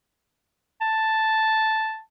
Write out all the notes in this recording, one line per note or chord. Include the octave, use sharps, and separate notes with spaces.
A5